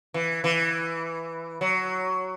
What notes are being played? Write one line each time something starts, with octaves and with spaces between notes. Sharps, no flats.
E3
E3
F#3